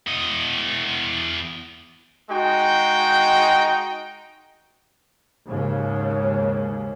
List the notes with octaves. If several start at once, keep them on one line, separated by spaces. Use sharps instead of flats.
E2 D#5
G#3 D#4 F#4 G5
D#2 G#2 C#3